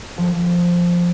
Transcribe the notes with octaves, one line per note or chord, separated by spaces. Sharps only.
F3